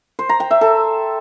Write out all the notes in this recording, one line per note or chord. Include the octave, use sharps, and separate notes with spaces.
C5
A#5
G5
E5
A4